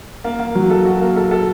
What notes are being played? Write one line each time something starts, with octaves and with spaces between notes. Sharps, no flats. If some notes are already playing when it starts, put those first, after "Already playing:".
A#3
A#3
F#3
A4
F#4
A#3
A4
A4